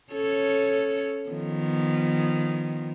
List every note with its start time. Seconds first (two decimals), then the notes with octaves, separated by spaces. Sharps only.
0.13 C#4 A4 C#5
1.29 D#3 F3 B3